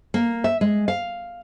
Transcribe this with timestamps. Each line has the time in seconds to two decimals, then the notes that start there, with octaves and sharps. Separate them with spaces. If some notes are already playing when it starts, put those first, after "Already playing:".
0.14 A#3
0.44 E5
0.61 G#3
0.88 F5